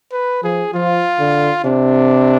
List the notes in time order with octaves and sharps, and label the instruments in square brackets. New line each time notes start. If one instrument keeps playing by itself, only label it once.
[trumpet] B4
[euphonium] F3 [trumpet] G#4
[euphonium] F3 [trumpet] F4
[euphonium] D3
[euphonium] C3 [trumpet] D4